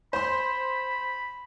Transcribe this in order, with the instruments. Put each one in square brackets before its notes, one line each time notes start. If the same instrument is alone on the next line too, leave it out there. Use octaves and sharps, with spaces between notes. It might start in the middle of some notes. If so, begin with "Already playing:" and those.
[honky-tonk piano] C5 C6 [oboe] B5